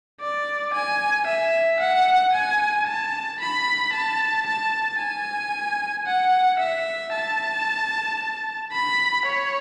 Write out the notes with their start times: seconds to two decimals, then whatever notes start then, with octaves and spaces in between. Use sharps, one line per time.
0.21 D5
0.74 G#5
1.27 E5
1.80 F#5
2.33 G#5
2.87 A5
3.40 B5
3.93 A5
4.47 A5
4.99 G#5
6.06 F#5
6.59 E5
7.13 A5
8.72 B5
9.25 C#5